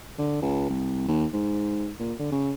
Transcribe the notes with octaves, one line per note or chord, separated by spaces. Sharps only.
D3
C#2
C2
D#2
G#2
A#2
D3
C#3